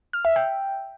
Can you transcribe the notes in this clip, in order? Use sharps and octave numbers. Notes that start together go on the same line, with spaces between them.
F6
E5
G5